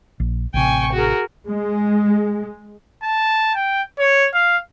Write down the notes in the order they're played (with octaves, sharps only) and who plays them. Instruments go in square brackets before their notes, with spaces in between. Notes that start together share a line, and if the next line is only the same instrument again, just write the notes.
[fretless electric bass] A#1
[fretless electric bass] A1 C3 [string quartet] G5 G#5 C#6
[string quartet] F#4 G#4 A#4
[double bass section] G#3
[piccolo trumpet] A5
G5
C#5
F5